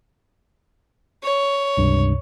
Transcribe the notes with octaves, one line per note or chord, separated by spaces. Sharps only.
C#5
C#2 G2 C3